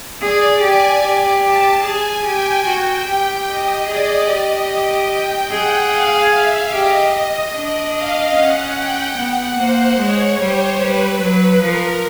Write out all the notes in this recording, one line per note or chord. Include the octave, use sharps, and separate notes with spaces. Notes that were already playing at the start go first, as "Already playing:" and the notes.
G#4 D5
G4 G#5
G4
A5
G#4 G#5
G4 G5
F#4
G4
D#5
G#4 D5
G4 D#5
G5
G#4 F#5
F5
E5
G4 D#5
D#5
D4
F5
C#4 F#5
G5
B3 F#5
A#3 C5
G#3 C#5
G3 C5
G3 B4
F#3
F3 A#4